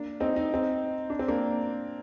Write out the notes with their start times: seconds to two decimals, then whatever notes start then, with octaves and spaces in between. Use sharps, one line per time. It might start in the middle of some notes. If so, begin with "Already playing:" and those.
Already playing: A#3 D4
0.20 C4 D#4
0.36 D#4
0.54 C4 D#4
1.10 D4
1.19 C4
1.28 A#3 D4